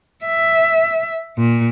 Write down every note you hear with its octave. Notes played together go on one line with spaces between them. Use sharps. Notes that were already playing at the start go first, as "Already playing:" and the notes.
E5
A#2